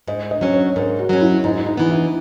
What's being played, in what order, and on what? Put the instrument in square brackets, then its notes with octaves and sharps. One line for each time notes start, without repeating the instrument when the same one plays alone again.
[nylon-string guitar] G#2 [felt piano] D#5
[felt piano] D#5
[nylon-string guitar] F#3 C#4
[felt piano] C#5
[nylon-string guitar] G#2 [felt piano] A#4
[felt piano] F#4
[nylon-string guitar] F#3 C#4
[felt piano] E4
[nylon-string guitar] G#2 [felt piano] D#4
[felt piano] D#4
[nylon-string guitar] E3 B3
[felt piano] E4